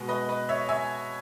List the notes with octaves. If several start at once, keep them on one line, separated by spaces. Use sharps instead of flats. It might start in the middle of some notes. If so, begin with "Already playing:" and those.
Already playing: B2 G#3
B4 D#5
B4 D#5
C#5 E5
E5 G#5